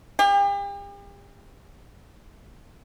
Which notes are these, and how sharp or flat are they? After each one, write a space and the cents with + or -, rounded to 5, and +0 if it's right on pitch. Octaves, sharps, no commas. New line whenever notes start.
G4 +40